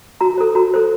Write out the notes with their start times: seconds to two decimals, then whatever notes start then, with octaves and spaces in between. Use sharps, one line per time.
0.21 F#4 A#5
0.38 A4 C5
0.55 F#4 A#5
0.74 A4 C5